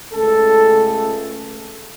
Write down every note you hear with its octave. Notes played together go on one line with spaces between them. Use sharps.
C#2 C#3 A3 A4